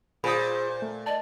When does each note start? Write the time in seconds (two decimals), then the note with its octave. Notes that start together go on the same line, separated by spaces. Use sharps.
0.24 A#2 F4 G#4 C5 B5 D#6
0.82 A3
1.06 D5 D#5 A5